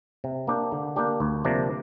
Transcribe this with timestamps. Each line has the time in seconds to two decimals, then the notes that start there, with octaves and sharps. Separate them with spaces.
0.24 C3
0.47 A#3 D4 G4
0.72 D3
0.96 A#3 D4 G4
1.20 D2
1.45 C3 F3 A#3 D4